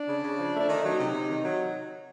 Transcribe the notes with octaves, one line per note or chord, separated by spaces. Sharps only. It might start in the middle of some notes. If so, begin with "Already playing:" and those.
Already playing: D4
C#3
C#3
F3
A3
D4
D#3 D#4
F#3
C3
C3
D#3
F#3